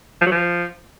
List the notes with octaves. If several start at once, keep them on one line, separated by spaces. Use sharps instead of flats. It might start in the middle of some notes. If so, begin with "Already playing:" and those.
F3
F#3
F3